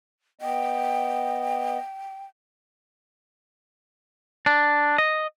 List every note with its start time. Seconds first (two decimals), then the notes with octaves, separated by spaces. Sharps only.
0.41 B3 D#5 G5
4.46 D4
4.98 D#5